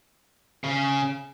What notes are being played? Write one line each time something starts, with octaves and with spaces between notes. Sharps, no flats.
C#3